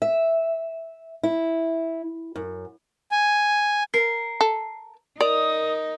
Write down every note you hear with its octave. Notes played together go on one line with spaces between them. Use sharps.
E5
E4
F#2
G#5
A#4 C7
A4
D#4 A#4 D5 D#6